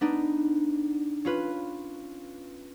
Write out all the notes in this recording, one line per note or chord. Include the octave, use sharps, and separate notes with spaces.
B3 D4 D#4
C#4 F4 B4